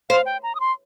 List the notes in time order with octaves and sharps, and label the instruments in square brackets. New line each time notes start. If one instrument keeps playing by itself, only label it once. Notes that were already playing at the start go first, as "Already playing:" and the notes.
[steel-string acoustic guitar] C5 [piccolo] F5
[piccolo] G5
A#5
D#6
C6